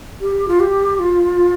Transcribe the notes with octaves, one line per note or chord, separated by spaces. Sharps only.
G4
F4
G4
F4